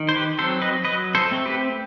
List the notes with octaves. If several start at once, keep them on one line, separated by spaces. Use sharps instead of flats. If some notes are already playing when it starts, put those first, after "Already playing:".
Already playing: D#3
C5
G4 B4
F#3 C4 A4 C5
B4 D#5
F#3 B4 D#5
A4 C5
A3 C4
G4 B4